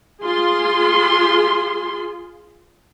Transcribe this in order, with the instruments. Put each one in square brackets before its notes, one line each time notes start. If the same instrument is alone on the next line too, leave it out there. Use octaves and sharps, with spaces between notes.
[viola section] F4 G#4 C6